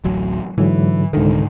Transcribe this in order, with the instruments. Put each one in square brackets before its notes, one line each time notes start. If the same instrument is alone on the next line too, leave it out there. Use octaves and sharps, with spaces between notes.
[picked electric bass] D1 A1 F#3
[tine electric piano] G#2 D3 F#3 [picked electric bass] E3
[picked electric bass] C2 D#3 [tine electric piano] G#2 D3